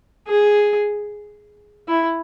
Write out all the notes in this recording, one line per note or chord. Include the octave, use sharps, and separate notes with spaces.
G#4
E4